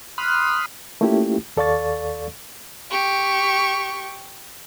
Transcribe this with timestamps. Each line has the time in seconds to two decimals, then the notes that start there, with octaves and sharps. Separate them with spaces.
0.18 B5 C6 D#6 F6 F#6
1.01 A3 A#3 C#4 E4 F4 G4
1.57 D#2 A4 D5 F5 C#6 A6
2.91 G4 C#6